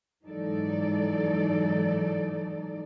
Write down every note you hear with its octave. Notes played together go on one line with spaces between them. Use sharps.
G#2 E3 F#3 D#4 A4 D5